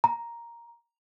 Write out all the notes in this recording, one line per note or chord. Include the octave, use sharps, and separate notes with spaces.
A#5